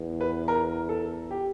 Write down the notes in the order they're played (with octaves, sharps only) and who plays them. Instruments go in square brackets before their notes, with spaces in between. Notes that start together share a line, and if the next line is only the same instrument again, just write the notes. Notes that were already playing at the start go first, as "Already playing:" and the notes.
Already playing: [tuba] E2
[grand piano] B4
A#4
A4
G4